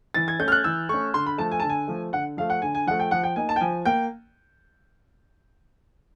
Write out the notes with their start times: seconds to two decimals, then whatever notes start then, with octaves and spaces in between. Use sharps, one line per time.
0.14 E3 A6
0.28 G#6
0.39 A3 C#4 G6
0.48 F6
0.52 F#6
0.64 E3 E6
0.89 A3 C#4 C#6
1.14 D3 C6
1.26 B5
1.38 F3 A3 A5
1.52 G#5
1.60 D3 A5
1.70 G#5
1.87 F3 A3
2.13 D3 F#5
2.37 F3 A3 F5
2.50 F#5
2.62 D3 G#5
2.75 G#5
2.87 F3 A3 F#5
3.00 G5
3.11 F3 F#5
3.23 G5
3.36 A#3 D#4 G#5
3.49 A5
3.56 G5
3.61 F3 G#5
3.85 A#3 G5